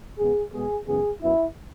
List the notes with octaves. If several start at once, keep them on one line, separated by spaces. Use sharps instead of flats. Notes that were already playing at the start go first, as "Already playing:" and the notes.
E2 C#3 G#3 B3 G#4
B2 G#3 B3 G#4
F#2 C#3 E3 G#3 B3 G#4
F#2 F#3 B3 E4